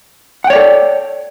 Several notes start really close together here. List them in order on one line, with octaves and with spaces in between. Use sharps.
F#5 G5 C#5 D5 A4